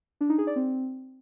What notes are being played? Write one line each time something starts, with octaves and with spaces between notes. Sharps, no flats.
D4
D#4
G#4
D5
C4